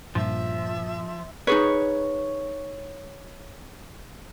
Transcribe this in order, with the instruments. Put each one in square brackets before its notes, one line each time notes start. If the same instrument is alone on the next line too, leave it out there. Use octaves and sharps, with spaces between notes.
[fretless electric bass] G2 A#2 G3 [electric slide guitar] F3 [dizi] E5
[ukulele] D#4 G#4 B4 [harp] C#5